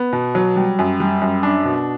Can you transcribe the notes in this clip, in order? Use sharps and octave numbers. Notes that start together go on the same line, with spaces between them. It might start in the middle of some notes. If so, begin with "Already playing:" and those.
Already playing: B3
B2
F#3
G3
F#2
G3
F#2
D4
B2